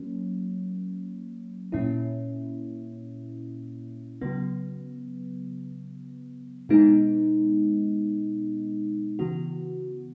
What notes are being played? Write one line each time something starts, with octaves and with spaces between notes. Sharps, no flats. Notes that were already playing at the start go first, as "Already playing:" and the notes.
Already playing: F#3 A#3 C#4
A#2 A#3 C#4 E4
C#3 F#3 B3
B2 G#3 B3 D#4
C#3 E3 B3 F#4